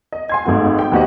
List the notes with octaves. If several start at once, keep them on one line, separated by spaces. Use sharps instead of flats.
D#5
G#5 C6 G#6
G#1 G#2 A3 B3 F#4
G5
D#2 B3 F#4 G4 C5 D#5